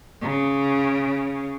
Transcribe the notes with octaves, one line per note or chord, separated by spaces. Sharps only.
C#3